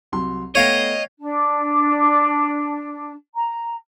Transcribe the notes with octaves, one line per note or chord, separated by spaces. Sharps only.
C2 F#3 C6
A3 B3 C#5 D#5 F5 G5 A#6
D4
A#5